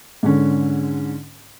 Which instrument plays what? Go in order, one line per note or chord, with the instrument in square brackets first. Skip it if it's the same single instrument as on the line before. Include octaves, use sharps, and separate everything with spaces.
[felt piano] G#2 D3 C#4